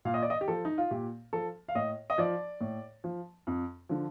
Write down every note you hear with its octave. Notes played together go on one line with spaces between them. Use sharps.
A#2 F5
D#5
D5
D#5
G4
F3 A4
D#4
F4
A#2 G4
F3 A4
F5
A2 D#5
D#5
F3 D5
A2
F3
F2
D3 F3